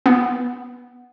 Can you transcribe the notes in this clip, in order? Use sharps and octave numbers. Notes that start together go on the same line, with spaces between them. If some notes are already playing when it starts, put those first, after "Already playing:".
B3